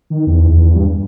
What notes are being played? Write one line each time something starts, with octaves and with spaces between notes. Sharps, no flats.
D#3
E2
E2
G2